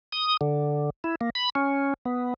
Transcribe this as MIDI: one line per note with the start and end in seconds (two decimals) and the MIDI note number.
0.13 0.37 87
0.41 0.90 50
1.04 1.15 64
1.21 1.30 58
1.35 1.50 83
1.55 1.94 61
2.06 2.34 59